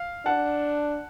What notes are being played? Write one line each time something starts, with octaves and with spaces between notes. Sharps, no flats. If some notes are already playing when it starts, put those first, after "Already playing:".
Already playing: F5
D4 F#5 A5